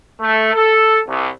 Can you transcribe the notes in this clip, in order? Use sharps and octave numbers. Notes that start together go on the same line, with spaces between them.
A3
A4
C2